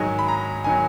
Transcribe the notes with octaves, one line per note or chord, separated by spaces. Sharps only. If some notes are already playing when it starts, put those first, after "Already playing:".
Already playing: G#2 D#3 F#3 G#5
B5
A#5
D#3 F#3 G#5